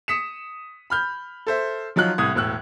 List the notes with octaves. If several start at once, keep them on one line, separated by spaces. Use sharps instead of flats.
D#6 B6 C#7 E7
B5 F6 G6
A4 C5 E5
F3 F#3 D#4 F4 F#6
C2 A2 D#6 G#6
E1 A2 E6 F#6